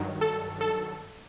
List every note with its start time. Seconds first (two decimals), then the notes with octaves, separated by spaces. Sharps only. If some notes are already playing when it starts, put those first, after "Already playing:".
Already playing: G2 D#3 F#3
0.21 A4
0.61 A4